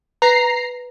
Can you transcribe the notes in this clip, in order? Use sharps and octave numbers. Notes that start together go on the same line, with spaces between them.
B4 A#5 C7